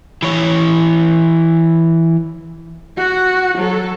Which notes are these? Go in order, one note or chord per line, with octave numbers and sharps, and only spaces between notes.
E3 C#5
F#4 F#5
F#3 A4